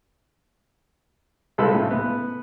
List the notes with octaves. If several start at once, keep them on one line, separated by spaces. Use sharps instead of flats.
C2 G#3 F4 A4 B4 B5
A2 C#3
B3